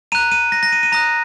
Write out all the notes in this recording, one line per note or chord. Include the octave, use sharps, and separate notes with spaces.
A#5 F#6 D#7
D#7
A#6
A#6
D#7
D#7
A#5 D#6 F#6 A#6